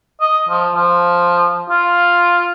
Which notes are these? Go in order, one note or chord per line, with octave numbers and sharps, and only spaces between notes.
D#5
F3
F3
F4